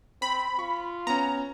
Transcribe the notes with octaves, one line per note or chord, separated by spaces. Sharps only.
C4 B5
F4 C#6
B3 C#4 A#5